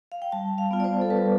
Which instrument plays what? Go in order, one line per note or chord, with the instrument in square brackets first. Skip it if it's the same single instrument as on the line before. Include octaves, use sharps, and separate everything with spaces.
[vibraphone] F5
G5
G3 A5
F5
B3 F4
D5
C5
A4
G3 B4